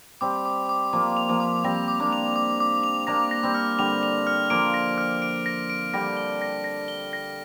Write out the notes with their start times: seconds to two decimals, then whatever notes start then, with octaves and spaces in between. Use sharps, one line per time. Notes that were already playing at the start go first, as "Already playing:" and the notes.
0.21 G3 C4 D6
0.46 D6
0.69 D6
0.93 F3 A#3 D6
1.17 F7
1.29 F3 A#3
1.40 D6
1.64 G3 C4 A#6
1.88 D6
2.00 A#3 D4
2.13 F7
2.36 D6
2.60 D6
2.84 F7
3.07 A#3 D4 A#6
3.31 A#6
3.43 G3 C4
3.54 F6
3.79 D3 G3 F7
4.03 F7
4.27 F6
4.50 F3 A#3 D7
4.74 A#6
4.98 F6
5.22 D7
5.46 A#6
5.70 D7
5.93 D3 G3 A#6
6.17 G7
6.42 A#6
6.64 A#6
6.88 G7
7.13 A#6